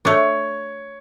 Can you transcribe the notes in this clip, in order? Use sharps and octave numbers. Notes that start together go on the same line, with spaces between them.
A3 D4 C#5 C#6